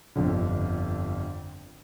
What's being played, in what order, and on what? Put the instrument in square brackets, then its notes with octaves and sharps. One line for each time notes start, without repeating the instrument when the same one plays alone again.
[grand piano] G1 F2 D3